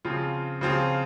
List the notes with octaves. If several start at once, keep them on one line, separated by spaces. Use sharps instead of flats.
C#3 F3 C4 F4
C#3 F3 C4 F4